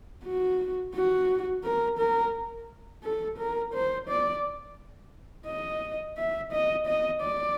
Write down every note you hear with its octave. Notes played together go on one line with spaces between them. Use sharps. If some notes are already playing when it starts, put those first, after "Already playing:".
F#4
F#4
A#4
A#4
A4
A#4
C5
D5
D#5
E5
D#5
D#5
D5